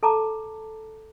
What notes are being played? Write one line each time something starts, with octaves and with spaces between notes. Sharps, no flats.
A4 A5 A#5 D6